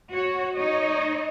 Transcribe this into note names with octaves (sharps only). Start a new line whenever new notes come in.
F#4 C#5
D#4 C#5 D#5